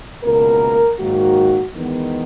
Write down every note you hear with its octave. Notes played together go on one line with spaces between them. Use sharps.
C#2 B2 A#3 A#4
G#2 D#3 F#3 A#3 F#4
E2 D#3 G#3 B3